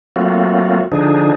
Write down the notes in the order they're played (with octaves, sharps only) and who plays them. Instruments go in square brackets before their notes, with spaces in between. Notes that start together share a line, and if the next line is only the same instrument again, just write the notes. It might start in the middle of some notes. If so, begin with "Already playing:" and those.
[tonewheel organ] F#3 A3 A#3 C4 F4 F#4
D3 F3 D4 D#4 G#4